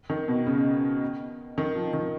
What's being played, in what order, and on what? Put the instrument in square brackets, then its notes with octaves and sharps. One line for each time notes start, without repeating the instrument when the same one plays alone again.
[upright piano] D#3
B2
C#3
D#3
F3
D#3